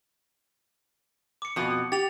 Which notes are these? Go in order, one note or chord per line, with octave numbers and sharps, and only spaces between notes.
D6 C#7
F2 B2
G4 A6 F7